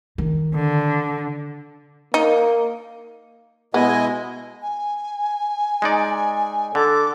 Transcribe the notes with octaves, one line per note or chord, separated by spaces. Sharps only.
D#3
D3
A#3 D#4
B2 G#3 B3 E4 D#5 G#5
G#5
G#3 D#4 D5
D3 A4 D6